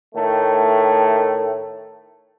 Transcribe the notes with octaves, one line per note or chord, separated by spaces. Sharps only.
A2 D#3 A3